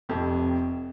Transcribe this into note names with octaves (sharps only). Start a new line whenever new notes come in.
F1 F2 C3